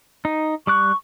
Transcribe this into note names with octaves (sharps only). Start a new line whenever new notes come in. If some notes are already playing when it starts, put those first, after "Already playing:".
D#4
G3 C#6 D6 F#6